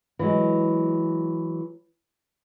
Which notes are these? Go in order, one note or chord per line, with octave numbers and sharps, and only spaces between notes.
E3 F#3 G#3